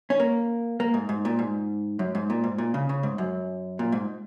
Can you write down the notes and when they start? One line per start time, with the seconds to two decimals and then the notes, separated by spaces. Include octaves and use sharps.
0.10 C#4
0.20 A#3
0.80 A#3
0.94 G#2
1.09 G#2
1.25 A#2
1.39 G#2
1.99 F#2
2.15 G#2
2.30 A#2
2.44 G#2
2.58 A#2
2.74 C#3
2.89 C#3
3.03 G#2
3.18 F#2
3.79 A#2
3.92 G#2